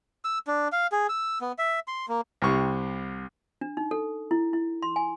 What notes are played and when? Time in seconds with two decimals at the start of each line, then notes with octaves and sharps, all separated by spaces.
0.25 E6
0.47 D4
0.72 F5
0.92 G#4
1.09 E6
1.41 B3
1.59 E5
1.88 C6
2.08 A#3
2.42 C2 C3 C#6
3.61 D4
3.77 D#4
3.91 A4
4.31 E4
4.53 E4
4.82 C6
4.96 G#5